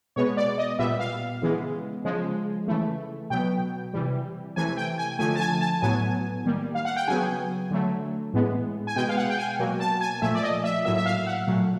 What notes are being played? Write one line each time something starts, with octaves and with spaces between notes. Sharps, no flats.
B2 G#3 B3 C#5
D5
D#5
A#2 G3 B3 E5
F5
C#3 E3 G#3 B3
C#3 F3 G#3
C#3 E3 A3
B2 F#3 B3 G5
C3 E3 G3
C3 E3 A3 G#5
G5
G#5
D3 F3 A3 G#5
A5
G#5
A5
A2 F#3 B3 G#5
D#3 G3 A#3
F5
F#5
G5
C#3 F#3 B3 G#5
D3 F#3 A3
A2 E3 G#3 B3
G#5
B2 G#3 B3 G5
F5
F#5
G5
G#5
B2 F#3 A#3
A5
G#5
A#2 F3 A3 E5
D5
D#5
E5
A2 F#3 A#3 E5
E5
F5
F#5
A#2 F#3 A3